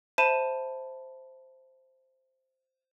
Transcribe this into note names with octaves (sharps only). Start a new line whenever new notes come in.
C5 E5 A5 B5 D#7 E7